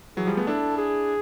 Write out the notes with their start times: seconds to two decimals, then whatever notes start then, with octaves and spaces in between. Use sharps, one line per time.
0.17 E3 F#3 G#4
0.27 F3 G3
0.37 A3 B3
0.47 D4 E4 A4
0.78 G#4